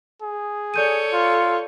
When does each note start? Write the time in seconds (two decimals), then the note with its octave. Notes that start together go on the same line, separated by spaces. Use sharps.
0.22 G#4
0.74 A4 C#5 D5 G6 D#7
1.13 F4